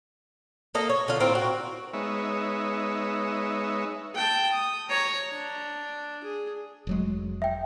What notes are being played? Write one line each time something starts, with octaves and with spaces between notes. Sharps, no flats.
A#3 A4 D#5
C#5
D3 F4
A2 A#3 C4 F4
F#4
G#3 B3 D#4 C#5 E5
G5 A5
D#6
C#5 A#5
D4
G#4
F1 F#3 G#3
E5 G5